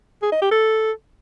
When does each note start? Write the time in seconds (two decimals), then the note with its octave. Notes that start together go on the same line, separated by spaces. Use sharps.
0.23 G#4
0.32 D#5
0.42 G4
0.51 A4